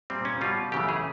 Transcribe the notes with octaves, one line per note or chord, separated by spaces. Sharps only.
A#2 G3 C4
C#4
B2 G3 F4
F#2 C#3 E3 A3 G4
G#4